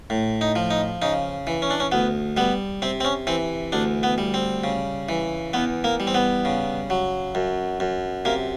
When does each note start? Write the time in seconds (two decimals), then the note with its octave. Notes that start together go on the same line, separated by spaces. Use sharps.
0.10 A2
0.41 D#4
0.56 F3
0.71 D#4
1.02 C#3 D#4
1.47 E3
1.62 C#4
1.70 D4
1.80 C#4
1.92 D2 B3
2.37 G3 B3
2.82 C3 C4
3.00 C4
3.05 C#4
3.27 E3 C4
3.72 D2 D4
4.03 B3
4.18 G3
4.34 C4
4.64 C#3
5.09 E3
5.53 E2 B3
5.84 A#3
6.00 G3
6.07 C4
6.15 B3
6.45 C#3
6.90 F#3
7.35 F#2
7.80 F#2
8.25 C3 A#3